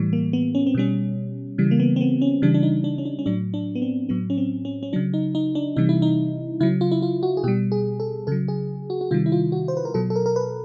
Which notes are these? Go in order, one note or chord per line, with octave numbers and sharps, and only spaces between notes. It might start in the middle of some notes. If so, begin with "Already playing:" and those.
Already playing: A2 E3 G3
A#3
B3
C#4
C4
B2 G3 C#4
C#3 E3 G3
A#3
B3
C4
B3
C#4
C#3 E3 G3 D4
D4
D#4
D4
C#4
D4
C#4
A2 F#3 D4
D4
B3
C4
A2 F#3 B3
C#4
C4
C#4
C#4
C#3 F#3 D4
D#4
D#4
D4
C3 E3 G3 D#4
E4
D#4
C#3 F#3 E4
F4
E4
F4
F#4
G#4
B2 G3 G4
G#4
A4
C#3 F#3 A4
G#4
F#4
F#4
C3 D#3 G3 F4
E4
F4
F#4
C5
B4
A#4
B2 F#3 A4
A4
A#4
A#4
B4